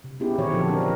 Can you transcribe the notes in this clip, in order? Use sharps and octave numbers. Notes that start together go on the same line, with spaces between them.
C3
B3 C#4 D#4 E4 G4 G#4
A#2 D#3 E3 C4 F#4 C#5
A#2 D3 F3 A#3 A4
C4 D4 A#4
A#4